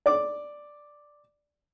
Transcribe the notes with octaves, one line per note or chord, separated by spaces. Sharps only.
D5 D6